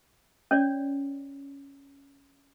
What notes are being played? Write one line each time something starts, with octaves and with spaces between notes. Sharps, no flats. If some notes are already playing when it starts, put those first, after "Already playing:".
C#4 C#5 D5